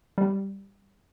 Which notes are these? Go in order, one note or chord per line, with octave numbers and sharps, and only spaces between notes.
G3